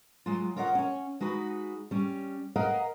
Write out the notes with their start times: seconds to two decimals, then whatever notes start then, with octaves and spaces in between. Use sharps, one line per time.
0.26 F#3 G#3 F4
0.56 F4 A#4 C#5 D#5 F5 F#5
0.75 C#4 C#5
1.21 G#3 D#4 F#4 B4
1.91 G3 C#4
2.56 A#4 B4 D#5 F5 F#5 A#5